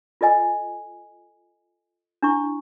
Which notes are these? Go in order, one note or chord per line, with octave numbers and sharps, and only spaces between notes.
F4 A4 D#5 G#5
D4 E4 C#6